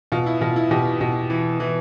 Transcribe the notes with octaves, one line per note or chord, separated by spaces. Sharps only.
B2 F4
E4
B2 F4
E4
B2 G4
B2
E3
E3